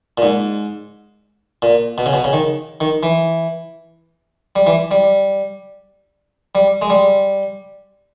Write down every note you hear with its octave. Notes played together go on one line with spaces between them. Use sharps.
A#2
G#2
A#2
B2
C#3
B2
C#3
D#3
D#3
E3
G3
E3
G3
G3
G#3
G3